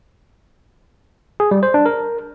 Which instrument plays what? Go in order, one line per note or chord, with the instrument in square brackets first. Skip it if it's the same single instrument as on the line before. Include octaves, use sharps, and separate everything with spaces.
[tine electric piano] G#4
G3
C5
D4
A#4